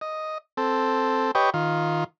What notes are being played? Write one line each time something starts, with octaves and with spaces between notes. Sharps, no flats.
D#5
C4 A4
G4 B4 C#5 D#5 G5
D#3 F4